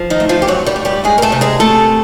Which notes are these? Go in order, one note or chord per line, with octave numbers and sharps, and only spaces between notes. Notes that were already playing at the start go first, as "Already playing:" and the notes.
Already playing: F3
D#3 D#4
A3
F3 F4
G4
G#2 F#3 F#4
G3 G4
A3
G3 G4
D2 G#3 G#4
A#4
A3 A4
C3
G#3 G#4
C3 A3 A4